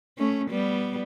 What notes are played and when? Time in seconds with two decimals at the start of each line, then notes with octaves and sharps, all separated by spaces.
0.18 A3 C#4
0.50 G3 B3